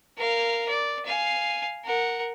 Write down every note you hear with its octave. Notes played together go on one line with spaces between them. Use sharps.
A#4 F5
D5
F5 G#5
A#4 F#5